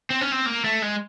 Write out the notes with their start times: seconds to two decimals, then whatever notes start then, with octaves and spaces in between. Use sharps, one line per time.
0.10 C4
0.21 C#4
0.32 C4
0.46 A#3
0.64 A3
0.82 G#3